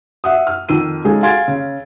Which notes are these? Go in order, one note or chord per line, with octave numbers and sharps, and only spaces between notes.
E5 F#5 D#6
F6
F2 D#3 E6 D#7
C#3 G#3 D#4 G#4 A4
F5 G#5 C6 G#6 A6 D7
C#3